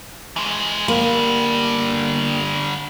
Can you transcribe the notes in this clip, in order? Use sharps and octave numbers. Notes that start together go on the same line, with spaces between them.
E3 G#3
D3 G3 A#3